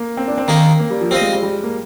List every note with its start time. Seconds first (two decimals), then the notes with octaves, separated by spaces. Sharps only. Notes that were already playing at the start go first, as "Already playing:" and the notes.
Already playing: A#3
0.17 C4
0.28 D4
0.38 C4
0.48 D#3 A#3 D#4 G#4
0.79 A#3
0.90 G3
1.01 F3
1.11 G3 C4 F4 C5 D#5
1.21 G#3
1.33 G3
1.43 G3
1.63 A#3